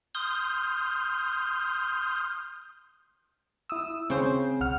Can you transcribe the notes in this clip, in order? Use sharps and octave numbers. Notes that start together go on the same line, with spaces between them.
C6 D#6 F6 G6
E4 D#6 E6
C#3 C4 C5
B1 F#5 F6